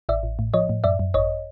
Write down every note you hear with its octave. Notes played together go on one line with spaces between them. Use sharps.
A1 D5 E5
A1
A2
F3 C#5 D#5
A2
F#2 D5 E5
F#2
G#1 C#5 D#5